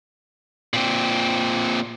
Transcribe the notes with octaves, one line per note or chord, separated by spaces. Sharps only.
A#2 C4